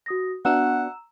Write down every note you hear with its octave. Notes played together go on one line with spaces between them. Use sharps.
F#4 D#6 A#6
B3 D4 F#4 F#5 A#5 E6 E7